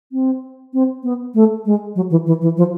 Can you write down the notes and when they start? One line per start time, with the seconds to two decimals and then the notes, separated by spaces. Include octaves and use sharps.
0.12 C4
0.73 C4
1.03 B3
1.34 A3
1.65 G#3
1.96 F#3
2.10 E3
2.26 E3
2.41 E3
2.57 F3